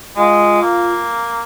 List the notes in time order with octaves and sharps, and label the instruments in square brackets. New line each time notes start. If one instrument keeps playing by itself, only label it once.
[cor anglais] G#3 [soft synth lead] F4
[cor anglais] A#3